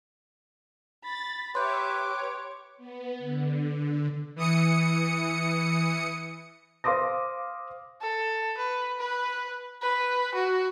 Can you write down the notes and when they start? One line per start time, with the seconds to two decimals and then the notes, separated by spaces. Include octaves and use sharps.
1.04 B5 A6
1.55 G4 B4 C#5 E5 C6 D6 G6
2.08 C#5
2.77 B3
3.18 D3
4.36 E3 D#6 C#7
6.84 C5 F5 C6 D6 D#6 A#6
8.01 A4
8.57 B4
8.99 B4
9.82 B4
10.34 F#4